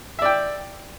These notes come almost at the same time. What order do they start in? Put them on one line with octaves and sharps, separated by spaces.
E5 D5 G5